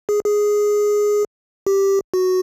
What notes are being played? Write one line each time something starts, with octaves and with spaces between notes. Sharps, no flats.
G#4
G#4
G4
F#4